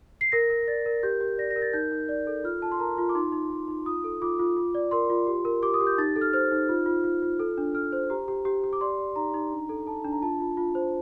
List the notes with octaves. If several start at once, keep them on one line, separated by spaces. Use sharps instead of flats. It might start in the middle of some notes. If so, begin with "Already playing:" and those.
C7
A#4 A#6
A#4
D5 A6
A#4
G4 G6
G4
D5 A#6
A#6
A#4
A6
D#4 G6
D#4
D5
A4
F4 F6
F4 A5
C6
A#4 A#5
F4
D6
D#4 C6
D#4
D#4
D#4
F4 D#6
A4
F4 D6
F4
F4
D5
A#4 C6
F4
G4
A#4
G4 D6
D#6
G4
G6
D#4 A6
A4
F6
C5 F6
D#4
F4
F4
F4
F4
A4
D4
A4 F6
C5
G4 A#5
G4
G4
G4
D6
D5 C6
D5
D#4 A#5
D#4
D4
A4
A4 A5
D4
A#5
F4 A5
F4
F4
C5